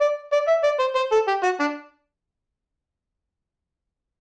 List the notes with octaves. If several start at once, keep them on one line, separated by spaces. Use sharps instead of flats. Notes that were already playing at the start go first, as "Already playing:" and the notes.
D5
D5
E5
D5
C5
C5
A4
G4
F#4
D4